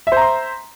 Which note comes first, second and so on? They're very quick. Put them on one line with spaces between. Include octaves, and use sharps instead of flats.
E5 C5 A#5 C6